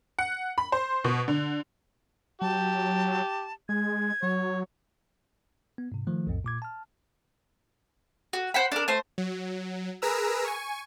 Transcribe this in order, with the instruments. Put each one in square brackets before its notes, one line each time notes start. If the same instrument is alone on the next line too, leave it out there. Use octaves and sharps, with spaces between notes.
[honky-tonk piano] F#5
B5
C5
B2
D3
[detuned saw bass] F#3 [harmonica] G4 [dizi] A5
[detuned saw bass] G#3 [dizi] G#6
[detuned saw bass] F#3 [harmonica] C#5
[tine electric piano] B3
G#2 C3
D#3 F3 A3
B1 F2 A2
A#2 D6 G#6
A5 F6
[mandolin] F#4
C5 F#5 B5
D4 A#4
A3 C5
[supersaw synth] F#3
G#4 A#4 B4 A#5 E6
G#5 C#6